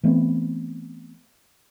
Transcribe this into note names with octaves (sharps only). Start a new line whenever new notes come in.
E3 A3 B3 C4